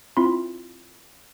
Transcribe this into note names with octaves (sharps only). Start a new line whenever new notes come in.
C4 E4 F4 B5 C6